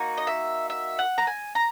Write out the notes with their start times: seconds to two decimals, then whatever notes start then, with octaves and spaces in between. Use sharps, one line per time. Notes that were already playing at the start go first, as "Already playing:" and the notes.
Already playing: A#3 D#4 F#4
0.18 D#5
0.27 E5
0.70 E5
0.99 F#5
1.18 A#5
1.27 G#5
1.55 A#5